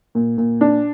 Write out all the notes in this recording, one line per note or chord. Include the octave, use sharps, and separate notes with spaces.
A#2
A#2
D4